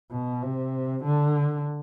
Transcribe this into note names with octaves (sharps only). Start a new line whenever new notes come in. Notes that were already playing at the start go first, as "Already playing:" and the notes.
B2
C3
D3